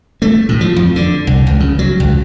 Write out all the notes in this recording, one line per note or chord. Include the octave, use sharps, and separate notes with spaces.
A3
A2
F3
F2
D3
C2
C#2
C#3
F#3
C#2